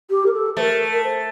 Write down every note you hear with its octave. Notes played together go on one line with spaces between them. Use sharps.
G4
A#4
A4
A3 A#4 C5
A#4
C5